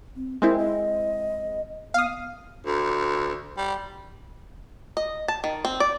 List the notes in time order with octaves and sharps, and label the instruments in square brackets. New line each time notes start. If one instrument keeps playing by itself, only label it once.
[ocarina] C4
[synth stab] G#3 C4 E4 [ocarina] A#4
[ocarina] D#5
[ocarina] B3 [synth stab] F5 D#6
[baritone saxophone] D2
G3
[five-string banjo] D#5
A5
D#3
C4
D5